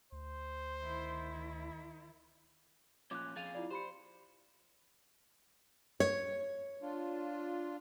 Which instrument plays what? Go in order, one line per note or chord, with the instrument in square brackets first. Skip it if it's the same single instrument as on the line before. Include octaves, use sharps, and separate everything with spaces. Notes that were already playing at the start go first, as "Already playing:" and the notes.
[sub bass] D2 [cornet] C5
[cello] D#3 E4
[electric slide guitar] A#2 F3 C#4 [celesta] D6 F#6
[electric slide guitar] F2 G#4 F5 [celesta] A6 D#7 F7
[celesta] E4 F4 D5
[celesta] G4 B5 C#7 [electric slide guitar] C5
[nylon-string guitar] C#5
[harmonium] D4 F4